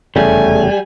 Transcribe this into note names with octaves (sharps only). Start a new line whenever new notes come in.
F1 E2 C#3 G3 A3 G#5